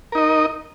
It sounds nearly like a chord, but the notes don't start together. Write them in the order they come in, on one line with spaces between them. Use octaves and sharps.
A#4 D#4 D#5